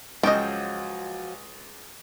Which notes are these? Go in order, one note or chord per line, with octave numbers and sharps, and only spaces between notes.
C#2 F3 F#3 D#5 G5